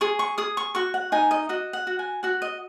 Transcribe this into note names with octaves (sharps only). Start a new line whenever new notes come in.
G#4 C#6
C#6
G#4 D#6
C#6
F#4 C#6
F#5
D#4 G#5
D#5
F#4 D#5
F#5
F#4
G#5
F#4 F#5
D#5